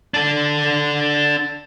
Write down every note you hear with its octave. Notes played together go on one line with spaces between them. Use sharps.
D4 A4